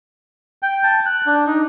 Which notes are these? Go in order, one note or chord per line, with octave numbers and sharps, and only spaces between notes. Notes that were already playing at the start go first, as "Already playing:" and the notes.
G5
A5
F#6
D4
D#4